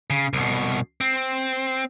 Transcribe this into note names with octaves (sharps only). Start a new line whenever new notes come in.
C#3
C2 B2
C4